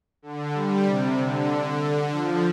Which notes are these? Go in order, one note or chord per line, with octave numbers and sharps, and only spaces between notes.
D3
G3
C3
D3
F3